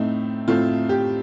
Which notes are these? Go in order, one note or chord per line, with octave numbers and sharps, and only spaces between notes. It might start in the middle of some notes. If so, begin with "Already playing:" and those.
Already playing: A2 A3 C4 D#4
A2 A3 C4 F4
G4